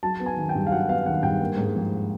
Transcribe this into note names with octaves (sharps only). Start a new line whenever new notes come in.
F#3 A5
B3
G#5
D#3
G5
G2
F5
F#3 F#5
B3 F5
D#3 F#5
G2 G5
A#3
G#2
F3